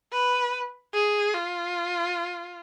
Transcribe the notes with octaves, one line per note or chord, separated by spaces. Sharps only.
B4
G#4
F4